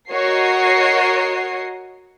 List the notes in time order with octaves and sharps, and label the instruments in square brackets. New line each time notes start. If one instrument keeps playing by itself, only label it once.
[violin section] F#4 A#4 C#5 D#5 C7